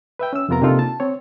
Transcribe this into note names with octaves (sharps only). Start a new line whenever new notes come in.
B4 E5 G5
C#4 E6
F2 C3 B3 F4 A#4 A#5
C3 A#3 D4 D#4 F4 A4
A5
C4 C#5